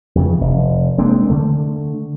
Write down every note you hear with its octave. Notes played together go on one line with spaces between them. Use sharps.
F2 C#3 E3
F1
G#3 A#3 C4 D4
D3 A3